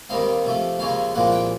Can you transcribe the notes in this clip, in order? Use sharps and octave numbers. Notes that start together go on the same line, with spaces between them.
D#2 D#3 G3 C4 D#4 F5
C3 F3 A3
D#2 C#3 F3 G#3 C#4 F5
C2 A#2 F3 G#3 F#5
G5